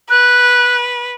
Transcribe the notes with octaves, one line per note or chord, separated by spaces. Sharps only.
B4 F#6